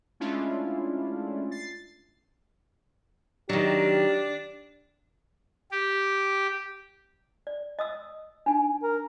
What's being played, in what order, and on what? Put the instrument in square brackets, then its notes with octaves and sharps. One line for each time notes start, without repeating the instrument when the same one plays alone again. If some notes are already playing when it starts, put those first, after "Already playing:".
[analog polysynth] G#3 A3 C#4 D4 E4 F4
A6 C7
[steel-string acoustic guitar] D#3 F#3 [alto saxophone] D4 [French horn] G4
[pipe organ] G4
[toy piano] D5
D#5 D#6 E6
D4 D#4 G#5
[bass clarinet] A#4